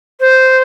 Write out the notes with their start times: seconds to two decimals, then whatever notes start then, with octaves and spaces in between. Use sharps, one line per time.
0.20 C5